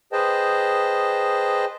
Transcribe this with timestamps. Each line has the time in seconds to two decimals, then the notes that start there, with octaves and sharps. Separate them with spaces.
0.12 G#4 B4 C5 D#5 G5 A5